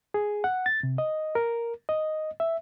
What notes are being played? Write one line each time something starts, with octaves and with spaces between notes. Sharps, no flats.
G#4
F#5
A6
C3
D#5
A#4
D#5
E5